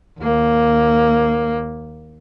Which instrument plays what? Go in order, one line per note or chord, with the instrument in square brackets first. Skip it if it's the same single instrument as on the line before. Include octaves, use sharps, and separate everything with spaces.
[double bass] D#2 A#3